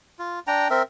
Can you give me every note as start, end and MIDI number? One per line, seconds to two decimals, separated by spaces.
0.19 0.40 65
0.47 0.68 62
0.47 0.68 79
0.47 0.68 82
0.70 0.82 60
0.70 0.82 70
0.70 0.82 76